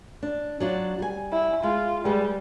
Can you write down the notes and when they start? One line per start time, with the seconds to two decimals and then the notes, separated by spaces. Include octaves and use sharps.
0.23 D4
0.60 F#3 D4 F4
0.99 G3 G#5
1.32 E4
1.63 G#3 F4
2.05 G3 G#3 B4